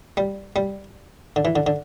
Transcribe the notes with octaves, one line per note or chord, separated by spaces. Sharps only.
G3
G3
D3
E3
D3
D3